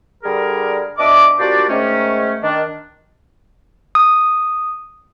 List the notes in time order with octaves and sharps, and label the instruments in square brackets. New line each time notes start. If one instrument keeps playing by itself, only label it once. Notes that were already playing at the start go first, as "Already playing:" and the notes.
[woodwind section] D3 G3 G#4 A#4
B2 D4 D#5 E5 D6
A#2 D4 F#4 G4 C5 D5
G#2 D#3 A3 C#4
D#3 D4
[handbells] D#6